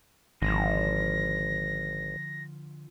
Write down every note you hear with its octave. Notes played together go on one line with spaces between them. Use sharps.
G#1 D3 F3 A#6